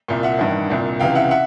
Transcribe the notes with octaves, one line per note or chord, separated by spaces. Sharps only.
C2 A#2
E5 F#5
A1 G2 D#3
C2 A#2
C#2 C3 E3 F5 G5
E5 F#5
E5 F#5